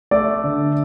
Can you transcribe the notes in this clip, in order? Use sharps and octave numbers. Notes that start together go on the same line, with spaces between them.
A3 D5
D3